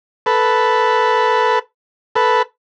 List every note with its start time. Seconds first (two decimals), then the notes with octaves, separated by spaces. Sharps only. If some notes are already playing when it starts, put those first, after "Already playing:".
0.26 A4 B4
2.15 A4 B4